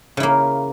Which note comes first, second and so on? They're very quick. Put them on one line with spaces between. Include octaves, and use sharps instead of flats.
C#3 E4 A#3